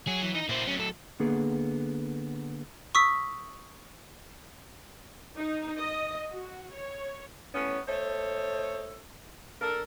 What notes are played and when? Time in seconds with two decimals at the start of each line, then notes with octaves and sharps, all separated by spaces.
0.07 F#3 G#4
0.22 E3
0.35 D#4
0.49 A#2 A#3 E4 C5
0.67 F#3 A3 C#4
0.80 A4
1.20 D3 A#3 B3 G#4
2.95 C#6 D#6 E6 B6
5.36 D#4
5.78 D#5
6.31 F#4
6.73 C#5
7.54 A2 B3 C#4
7.87 A3 D#4 A4 C5 C#5
9.61 D4 A4 A#4